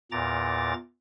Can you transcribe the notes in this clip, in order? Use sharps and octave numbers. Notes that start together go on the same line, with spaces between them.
E2 A#2 A#5 D6 A6